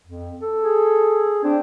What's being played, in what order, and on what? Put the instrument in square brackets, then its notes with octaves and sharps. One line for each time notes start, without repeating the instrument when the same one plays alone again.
[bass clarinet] F2
A4
[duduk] G#4
[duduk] C4 [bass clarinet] D4